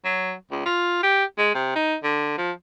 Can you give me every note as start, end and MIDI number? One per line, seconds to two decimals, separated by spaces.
0.05 0.33 54
0.51 0.61 37
0.66 1.01 65
1.03 1.24 67
1.38 1.52 56
1.54 1.73 48
1.75 1.96 63
2.04 2.37 50
2.38 2.51 53